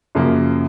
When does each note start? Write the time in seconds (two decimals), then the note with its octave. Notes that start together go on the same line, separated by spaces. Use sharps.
0.15 F#2 C#3 F3 A#3